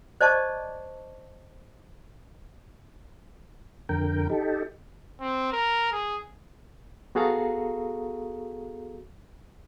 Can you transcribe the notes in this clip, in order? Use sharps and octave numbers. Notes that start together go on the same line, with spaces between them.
C5 D5 D#5 A5 C#6 D6
F2 D3 A#4 G5
D#4 G4 A4
C4
A#4
G#4
B3 F#4 G#4 A4 F5 A#5